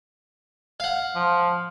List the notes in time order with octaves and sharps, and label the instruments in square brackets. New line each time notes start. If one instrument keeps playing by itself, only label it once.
[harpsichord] F5 F#5
[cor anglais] F3